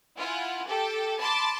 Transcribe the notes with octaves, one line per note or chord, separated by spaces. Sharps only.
E4 F4 F#5 G#5
G4 A4 G5
A5 B5 C6 D6